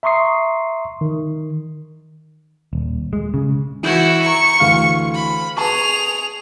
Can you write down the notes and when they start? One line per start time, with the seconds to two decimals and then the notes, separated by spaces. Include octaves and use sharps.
0.03 E5 A#5 C6 C#6 D#6 C7
1.01 D#3
2.73 D#1
3.13 G#3
3.34 C#3
3.83 E3 E4 F#4 G6 G#6
4.26 A#5 C#6
4.60 D2 E3 F5
5.15 B5
5.57 G#4 B4 A5 C#6 F7